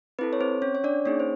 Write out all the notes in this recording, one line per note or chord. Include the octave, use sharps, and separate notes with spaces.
C4 E4 A4 B4
C#5
C4 C5
C#4 C#5
C#5
D4 D5
A#3 C#4 D#4 G#4 C#5
C5